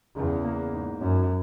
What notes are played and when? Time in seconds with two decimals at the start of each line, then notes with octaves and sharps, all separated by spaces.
0.16 E2 C#3
0.45 A#3
0.73 G#2
1.00 F#2 C#4